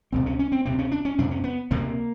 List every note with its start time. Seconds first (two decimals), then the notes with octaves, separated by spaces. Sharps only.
0.12 C#2 C3 C4
0.26 C#4
0.39 C#4
0.52 C4
0.65 D2 C3 C4
0.79 C#4
0.92 D4
1.05 C#4
1.18 F2 C3 D4
1.31 C#4
1.44 B3
1.71 D2 C3 A#3